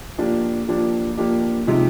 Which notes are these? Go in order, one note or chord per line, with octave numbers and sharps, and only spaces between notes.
F3 A#3 D4 G4
F3 A#3 D4 G4
F3 A#3 D4 G4
C3 F3 G#3 D#4 G4